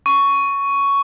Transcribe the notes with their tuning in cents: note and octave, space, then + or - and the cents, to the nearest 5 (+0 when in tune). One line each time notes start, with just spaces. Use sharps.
C#6 +10